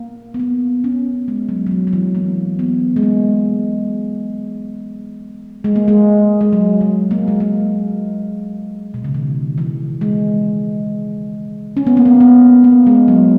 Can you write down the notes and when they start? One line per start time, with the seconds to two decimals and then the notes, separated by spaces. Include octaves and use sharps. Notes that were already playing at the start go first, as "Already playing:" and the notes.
Already playing: A#3
0.34 B3
0.40 A#3
0.84 C#4
1.28 G#3
1.49 F#3
1.67 F#3
1.71 E3
1.87 F#3
1.93 E3
2.15 A#3
2.59 B3
2.96 G#3
3.03 A#3
5.64 G#3
5.76 A#3
5.88 G#3
6.41 G#3
6.53 F#3
6.81 G#3
7.11 A#3
7.28 G#3
7.40 A#3
8.94 B2
9.04 C#3
9.14 D#3
9.58 E3
10.01 G#3
11.77 C#4
11.87 B3
11.97 A#3
12.05 B3
12.20 B3
12.64 A#3
12.87 G#3
13.08 F#3